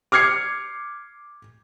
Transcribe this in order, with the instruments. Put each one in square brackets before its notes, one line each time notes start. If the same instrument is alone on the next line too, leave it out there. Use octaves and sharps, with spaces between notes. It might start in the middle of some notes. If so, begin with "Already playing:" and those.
[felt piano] D6 F6 G#6 C7 C#7